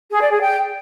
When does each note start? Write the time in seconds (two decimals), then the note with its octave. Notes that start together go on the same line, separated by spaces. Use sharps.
0.11 G#4
0.21 D5
0.31 G#4
0.41 G5